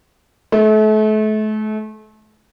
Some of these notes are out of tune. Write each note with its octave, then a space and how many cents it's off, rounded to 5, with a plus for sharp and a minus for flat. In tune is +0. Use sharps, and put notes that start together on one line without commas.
A3 -35